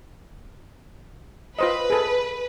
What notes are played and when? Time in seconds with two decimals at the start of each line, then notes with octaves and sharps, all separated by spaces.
1.59 F4 B4 C5 D#5
1.90 G#4 A4